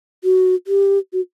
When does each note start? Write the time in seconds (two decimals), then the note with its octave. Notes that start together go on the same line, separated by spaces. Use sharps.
0.24 F#4
0.67 G4
1.13 F#4